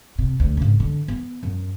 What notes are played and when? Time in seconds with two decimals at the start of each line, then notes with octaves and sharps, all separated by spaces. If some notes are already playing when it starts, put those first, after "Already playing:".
0.19 C3
0.40 D2
0.57 G#1 C#3
0.80 D3
1.08 B3
1.43 F#2